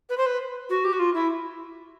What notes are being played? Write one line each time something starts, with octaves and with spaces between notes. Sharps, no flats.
B4
C5
B4
F#4
G4
F#4
F4
E4